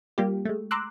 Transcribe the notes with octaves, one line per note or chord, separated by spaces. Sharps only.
G3 A#3 F4 G4
G#3 A3
A#5 C6 D6 E6 F#6